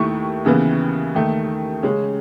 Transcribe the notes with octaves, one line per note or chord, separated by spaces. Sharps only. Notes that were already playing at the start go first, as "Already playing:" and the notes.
Already playing: D#2 D#3 A3 E4 C#6
D#2 C#3 E3 B3 E4
D#2 D#3 A3
C#3 G#3 C#4